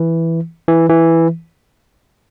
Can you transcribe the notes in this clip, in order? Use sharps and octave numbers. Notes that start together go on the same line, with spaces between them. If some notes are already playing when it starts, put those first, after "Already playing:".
Already playing: E3
E3
E3